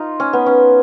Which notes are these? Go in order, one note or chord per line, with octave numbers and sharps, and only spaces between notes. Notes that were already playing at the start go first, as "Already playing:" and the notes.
Already playing: D#4 F4
C#4
B3
C#4